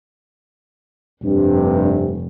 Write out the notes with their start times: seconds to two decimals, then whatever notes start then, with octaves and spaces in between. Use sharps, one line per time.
1.24 F1 G2 C3